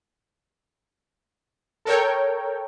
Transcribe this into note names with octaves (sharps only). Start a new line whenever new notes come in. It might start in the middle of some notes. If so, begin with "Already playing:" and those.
A4 A#4 C#5 G5